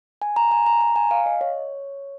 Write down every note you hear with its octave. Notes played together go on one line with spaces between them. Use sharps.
G#5
A#5
G#5
A#5
A#5
G#5
F5
D#5
C#5